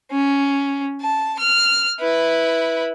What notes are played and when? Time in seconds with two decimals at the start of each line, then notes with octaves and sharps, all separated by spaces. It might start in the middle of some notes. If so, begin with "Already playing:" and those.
0.11 C#4
1.01 A5
1.39 F6
2.00 E4 B4